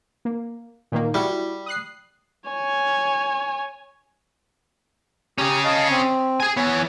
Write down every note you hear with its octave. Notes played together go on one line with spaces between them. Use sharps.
A#3
A#2 D#3 A#3
G3 E4 F#4
D#6 F#6 C7
C#5 G#5
C#4 G4 G#4 A#5
D#5 F5 A5
C4
G#4 G#5
E2 B3 C#5 G#5